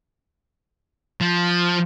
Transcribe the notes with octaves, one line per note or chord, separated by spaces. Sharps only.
F3